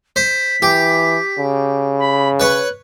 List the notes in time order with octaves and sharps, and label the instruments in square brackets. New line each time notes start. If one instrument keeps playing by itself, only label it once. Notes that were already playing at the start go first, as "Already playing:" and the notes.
[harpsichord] C5 [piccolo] B6
[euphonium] E3 [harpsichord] G4
[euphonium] C#3
[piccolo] B5
[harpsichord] B4 C#5 [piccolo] F#6